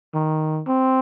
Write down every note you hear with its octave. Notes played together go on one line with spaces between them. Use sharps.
D#3
C4